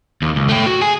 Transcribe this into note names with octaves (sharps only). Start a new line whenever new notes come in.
D#2
C#2
A3 G5
F#4
G#4 G#5